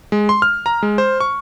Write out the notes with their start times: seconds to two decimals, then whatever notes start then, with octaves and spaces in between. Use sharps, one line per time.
0.12 G#3
0.29 C6
0.42 F6
0.66 A#5
0.83 G#3
0.98 C5
1.20 C#6